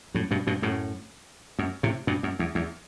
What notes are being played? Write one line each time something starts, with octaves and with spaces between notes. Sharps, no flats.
F#2 A2
G2 B2
G2 B2
F#2 A2
F#2
A2 C3
G2 B2
F#2
E2
E2